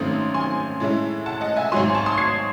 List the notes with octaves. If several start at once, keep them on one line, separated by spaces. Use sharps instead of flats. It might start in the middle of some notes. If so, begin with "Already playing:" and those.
Already playing: G#1 F#2 D#3 A3 C4 C6 D#6
G#5 C6
A2 G#3 C#4 E4
F#5 A5
D#5 F#5
E5 G#5
G#1 G#2 F#3 G#5 C6
A5 C#6
C6 D#6
G#6 C7